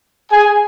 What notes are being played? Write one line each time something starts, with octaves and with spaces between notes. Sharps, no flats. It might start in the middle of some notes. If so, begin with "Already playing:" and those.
G#4 G#5